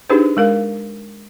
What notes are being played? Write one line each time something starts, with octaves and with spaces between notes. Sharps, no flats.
D4 D#4 G4 G#4 B4 C5
G#3 A#4 F5